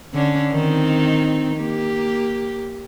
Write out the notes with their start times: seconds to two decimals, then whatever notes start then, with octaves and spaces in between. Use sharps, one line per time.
0.14 D3 C#4 D4
0.52 D#3 C4 D#4
1.57 A#3 G4